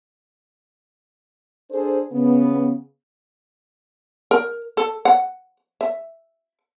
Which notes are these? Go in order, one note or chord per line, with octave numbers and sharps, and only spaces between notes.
D4 G#4 A4 C5
C#3 B3
A#4
A4
F#5
E5